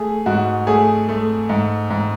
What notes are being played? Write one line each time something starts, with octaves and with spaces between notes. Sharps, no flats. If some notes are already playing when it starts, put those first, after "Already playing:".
Already playing: A3 G#4
G#2 F#4
A3 G#4
A3
G#2
G#2